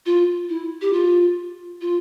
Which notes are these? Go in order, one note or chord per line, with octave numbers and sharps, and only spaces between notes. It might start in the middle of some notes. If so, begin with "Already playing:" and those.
F4
E4
G4
F4
F4